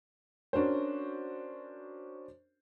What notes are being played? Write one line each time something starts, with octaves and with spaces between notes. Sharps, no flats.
C#4 D4 F#4 A#4 C5